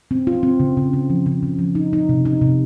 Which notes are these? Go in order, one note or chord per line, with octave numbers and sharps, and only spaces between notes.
C4
F4
C4
C#3
C#3
C#3
F3
C#3
C#3
F3
D#4
D#4
C3
D#4
C3